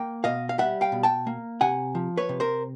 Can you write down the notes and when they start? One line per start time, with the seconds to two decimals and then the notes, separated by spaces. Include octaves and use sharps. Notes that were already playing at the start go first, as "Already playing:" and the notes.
Already playing: A#3 G5
0.24 B2 D#5 F5
0.49 F5
0.58 G3 E5 F#5
0.81 F5 G5
0.92 B2
1.03 G5 A5
1.27 A#3
1.61 C3 F#5 G#5
1.95 F3
2.17 B4 C#5
2.29 C3
2.40 A#4 C5